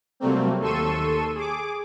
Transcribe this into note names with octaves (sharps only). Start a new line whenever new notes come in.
C3 F#3 G3 A3 A#3 C4
D#2 A4 C6 C#6 E6 D#7
G#4 D6